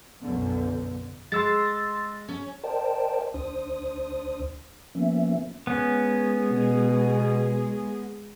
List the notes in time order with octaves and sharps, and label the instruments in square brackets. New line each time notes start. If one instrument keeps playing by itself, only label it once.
[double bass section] B1 F#2 D3 [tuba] B3
[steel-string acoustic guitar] G#3 [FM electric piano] C6 E6 A6
[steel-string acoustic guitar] C#4
[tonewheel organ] A#4 C5 D5 D#5 G5 A5
D2 D4 C5 D#6
F3 A#3 B3 C#4 E5
[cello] G#3 G#4 [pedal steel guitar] B3 C#4
[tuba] B2